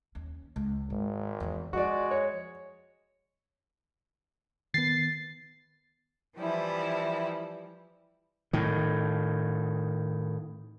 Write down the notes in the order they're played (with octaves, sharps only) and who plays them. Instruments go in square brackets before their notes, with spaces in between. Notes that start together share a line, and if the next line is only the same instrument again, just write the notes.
[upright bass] D#2 C#4
C#2
[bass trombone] G#1 [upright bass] G#2
[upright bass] E2 D3
[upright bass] F3 [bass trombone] G#3 [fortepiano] F#4 D5
[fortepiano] C#5
[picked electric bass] D#3 B3 [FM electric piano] A6 C7
[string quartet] E3 F3 G3 E4
[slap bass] A2 D#3